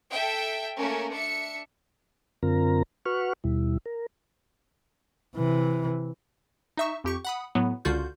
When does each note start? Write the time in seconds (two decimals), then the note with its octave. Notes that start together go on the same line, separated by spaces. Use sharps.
0.10 A4 E5 G5
0.77 A3 A#3 C#4 A#4
1.12 D4 E5 C#7
2.43 F#2 D3 C4 F4 A#4 A#5
3.06 F#4 B4 F#5 C#6 F6
3.44 D#2 B2 G3 E4
3.86 A#4
5.35 C3 E3
6.77 D#4 E5 C#6
7.04 F2 G4 C#6
7.25 F#5 B5 D#6
7.55 A2 F#3 B3
7.85 C#2 D3 F4 F#4 G6